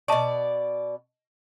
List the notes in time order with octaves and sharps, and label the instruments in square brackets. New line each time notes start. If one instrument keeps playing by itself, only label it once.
[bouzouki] B2 D5 [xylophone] D#5 A5 C#6